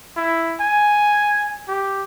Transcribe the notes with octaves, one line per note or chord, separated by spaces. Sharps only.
E4
G#5
G4